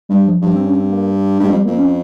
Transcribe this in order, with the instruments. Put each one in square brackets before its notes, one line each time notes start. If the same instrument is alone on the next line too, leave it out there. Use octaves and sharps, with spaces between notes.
[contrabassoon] G2 [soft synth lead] G3
[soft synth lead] F3
[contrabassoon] G2 [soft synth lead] F3
[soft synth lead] C4
C#4
C4
A#3
[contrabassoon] G2 [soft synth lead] G#3
[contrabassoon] F2 [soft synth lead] G3
[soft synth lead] A#3
[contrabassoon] F2
[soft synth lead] C#4